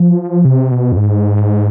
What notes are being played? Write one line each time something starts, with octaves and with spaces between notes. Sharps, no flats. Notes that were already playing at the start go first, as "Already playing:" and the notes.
Already playing: F3
C3
B2
F2
G#2